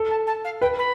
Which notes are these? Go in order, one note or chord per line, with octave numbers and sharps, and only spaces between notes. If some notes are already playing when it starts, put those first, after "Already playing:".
Already playing: A4
A5
A5
F5
B4 G5
B5